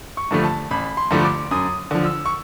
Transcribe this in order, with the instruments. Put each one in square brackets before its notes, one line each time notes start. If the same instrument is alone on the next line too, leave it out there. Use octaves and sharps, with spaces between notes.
[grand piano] C#6
G2 D3 F3 A3
A5
A1 B5
C6
G2 D3 F3 A3
D6
F#2 D#6
D3 F3
E6
C#6